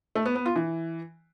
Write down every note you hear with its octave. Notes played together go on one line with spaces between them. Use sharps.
A3
B3
B3
F4
E3